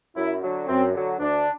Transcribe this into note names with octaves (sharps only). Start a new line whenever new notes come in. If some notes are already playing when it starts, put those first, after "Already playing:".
F#2 E4
D3 F#3
F#2 C4
D3 F#3
D2 D4